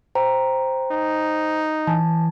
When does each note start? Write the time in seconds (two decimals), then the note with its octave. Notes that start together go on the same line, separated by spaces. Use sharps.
0.15 C5 G5 A#5
0.92 D#4
1.87 E3 G#5 A5